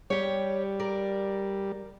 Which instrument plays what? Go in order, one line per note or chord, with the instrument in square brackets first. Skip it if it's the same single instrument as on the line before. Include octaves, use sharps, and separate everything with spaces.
[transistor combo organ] G3 [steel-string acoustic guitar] G4 C#5
[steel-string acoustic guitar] A#4 D5